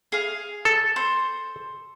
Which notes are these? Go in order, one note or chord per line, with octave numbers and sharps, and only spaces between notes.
G#4 F5
A4
C5